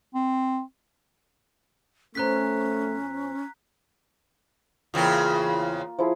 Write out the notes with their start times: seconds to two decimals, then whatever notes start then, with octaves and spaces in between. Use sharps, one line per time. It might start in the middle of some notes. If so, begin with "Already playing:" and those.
0.15 C4
2.15 F2 A3 B3 C#4 C5 A#5 F#6 B6
4.94 E2 C#3 A#3 C4 F4
5.99 F3 E4 G#4